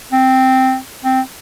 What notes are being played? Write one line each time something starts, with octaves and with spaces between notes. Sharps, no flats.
C4
C4